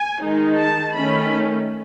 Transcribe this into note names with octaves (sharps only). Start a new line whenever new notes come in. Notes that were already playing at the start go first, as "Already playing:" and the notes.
Already playing: G#5
D#3 G#3 D#4
A5
D#3 A3 C#4 B5